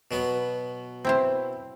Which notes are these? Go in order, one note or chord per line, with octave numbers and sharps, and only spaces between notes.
B2 F#3 B3
C4 E4 C5